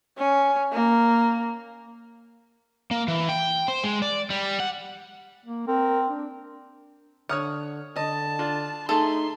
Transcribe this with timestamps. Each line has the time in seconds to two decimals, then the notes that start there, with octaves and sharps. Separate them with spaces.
0.18 C#4
0.73 A#3
2.91 A#3
3.08 E3
3.29 G5
3.68 C5
3.84 G#3
4.02 D5
4.30 G3
4.60 F#5
5.46 A#3
5.68 C4 A#4
6.09 D4
7.29 D3 C#5 F#5 D#6 F6
7.96 D3 D#5 A5
8.39 D4 F4
8.89 A3 D#4 G#4 A4 C6